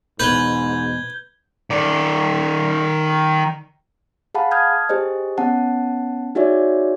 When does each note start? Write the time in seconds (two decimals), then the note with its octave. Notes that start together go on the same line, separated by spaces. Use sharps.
0.20 E2 G#2 B2 B4 G6 G#6 G7
1.70 D#3 D5
4.35 G#4 F5 F#5 A5 B5
4.51 A5 D#6 F6 G6 G#6
4.89 G4 G#4 C5 D#5
5.38 B3 C#4 F#5 A5
6.35 D#4 F#4 G#4 C#5 D5 E5